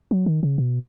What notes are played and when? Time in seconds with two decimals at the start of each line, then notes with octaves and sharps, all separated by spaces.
0.11 F#3
0.26 D#3
0.43 C#3
0.58 B2